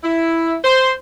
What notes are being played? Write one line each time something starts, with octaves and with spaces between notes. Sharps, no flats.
E4
C5